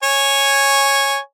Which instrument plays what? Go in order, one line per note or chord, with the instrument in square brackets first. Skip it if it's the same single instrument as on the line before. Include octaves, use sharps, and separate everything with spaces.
[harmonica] C#5 G#5